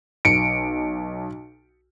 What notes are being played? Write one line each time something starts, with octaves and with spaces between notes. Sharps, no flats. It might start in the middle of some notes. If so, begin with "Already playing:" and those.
B1 C#7 D7